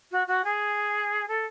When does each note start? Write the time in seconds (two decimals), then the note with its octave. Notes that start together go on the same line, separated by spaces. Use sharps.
0.11 F#4
0.27 F#4
0.44 G#4
1.27 A4